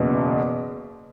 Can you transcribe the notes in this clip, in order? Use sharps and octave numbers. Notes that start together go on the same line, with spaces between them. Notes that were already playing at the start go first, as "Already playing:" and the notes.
Already playing: F#1 E2 B2